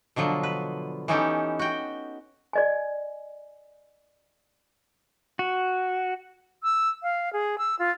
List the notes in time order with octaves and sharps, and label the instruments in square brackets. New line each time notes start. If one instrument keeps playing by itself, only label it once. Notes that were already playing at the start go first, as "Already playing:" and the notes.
[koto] B2 D3 F3 F#3
B4
E3 B3 C#4 D#4 G4 A4
F#4 G5
[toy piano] D5 D#5 G#5
[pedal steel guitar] F#4
[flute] E6
F5
G#4
E6
F4